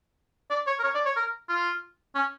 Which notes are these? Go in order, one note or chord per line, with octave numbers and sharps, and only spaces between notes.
D5
C#5
A#4
C#5
D5
C#5
A#4
F4
C#4